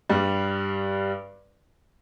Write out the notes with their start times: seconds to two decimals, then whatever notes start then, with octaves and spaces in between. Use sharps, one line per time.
0.09 G2 G3